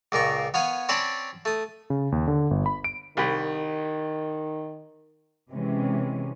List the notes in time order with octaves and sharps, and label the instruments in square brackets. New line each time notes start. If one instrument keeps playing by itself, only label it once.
[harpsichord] C#2 A#2 A#3 C#6
B3 C#5 F5 G#5
C4 C#4 C#5 D5 A5 B5
A3 D#6
[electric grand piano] C#3
D#2
D3
G1
B5
D7
[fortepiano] C2 G4 B5 [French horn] D#3
[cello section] C3 E3 G#3 C#4